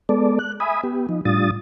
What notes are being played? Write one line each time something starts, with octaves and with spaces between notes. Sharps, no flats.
G#3 B3 A4 D5
F#6
E5 G#5 B5 D#6
B3 G4
F3 D#4
A2 G3 D4 F4 D#6 A6